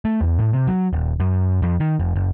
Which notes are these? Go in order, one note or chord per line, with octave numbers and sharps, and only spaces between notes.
A3
E2
A2
C3
F#3
D#1
F#2
F2
D#3
F1
F#1